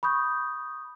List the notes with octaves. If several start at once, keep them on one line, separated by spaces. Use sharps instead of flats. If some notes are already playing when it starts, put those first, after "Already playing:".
B5 C#6 D#6 G6